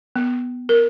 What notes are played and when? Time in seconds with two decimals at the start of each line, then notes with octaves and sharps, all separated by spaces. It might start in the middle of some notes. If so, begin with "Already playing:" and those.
0.16 B3
0.69 A#4